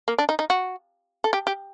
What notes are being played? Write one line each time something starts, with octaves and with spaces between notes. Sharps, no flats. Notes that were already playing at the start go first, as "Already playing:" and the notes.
A#3
D4
D#4
D#4
F#4
A4
G4
G4